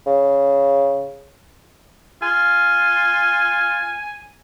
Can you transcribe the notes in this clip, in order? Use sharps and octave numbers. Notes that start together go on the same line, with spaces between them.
C#3
F4 G#5